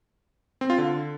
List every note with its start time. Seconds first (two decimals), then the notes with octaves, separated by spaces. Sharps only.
0.61 C4
0.70 F4
0.78 D3